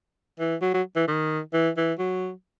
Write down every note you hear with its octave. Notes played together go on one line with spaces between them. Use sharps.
E3
F#3
F#3
E3
D#3
E3
E3
F#3